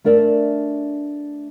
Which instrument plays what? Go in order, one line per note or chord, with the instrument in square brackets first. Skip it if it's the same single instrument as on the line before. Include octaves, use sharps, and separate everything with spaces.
[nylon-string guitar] A3 D4 A#4 D5 E5